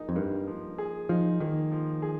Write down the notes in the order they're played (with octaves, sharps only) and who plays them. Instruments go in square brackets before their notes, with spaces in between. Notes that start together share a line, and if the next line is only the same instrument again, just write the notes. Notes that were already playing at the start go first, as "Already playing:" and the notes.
Already playing: [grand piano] F3 A#3 D#4 G#4
[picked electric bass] F2
[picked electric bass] G2 [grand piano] A#3
[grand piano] F3
G#4
[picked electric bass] F3 [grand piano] D#4
[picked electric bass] D#3 [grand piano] A#3
[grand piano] F3
G#4